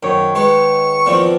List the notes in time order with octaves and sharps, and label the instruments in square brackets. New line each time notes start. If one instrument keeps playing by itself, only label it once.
[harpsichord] F#2 [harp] D#3 C#5
[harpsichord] G#3 B3 [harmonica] C#6
[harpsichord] E2 A#2 F3 [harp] C4